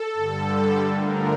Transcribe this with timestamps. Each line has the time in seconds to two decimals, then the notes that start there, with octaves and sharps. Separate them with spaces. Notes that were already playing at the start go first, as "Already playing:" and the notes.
Already playing: A4
0.14 G2 D3 G3
0.93 D3 F3 A3 D4 A#4